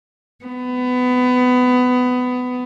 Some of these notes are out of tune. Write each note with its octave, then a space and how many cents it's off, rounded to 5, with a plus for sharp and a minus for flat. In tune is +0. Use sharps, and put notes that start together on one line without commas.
B3 +20